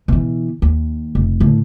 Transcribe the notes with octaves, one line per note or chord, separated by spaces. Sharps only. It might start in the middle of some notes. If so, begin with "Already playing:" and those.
B2 E3
D#2
F1
A2 D3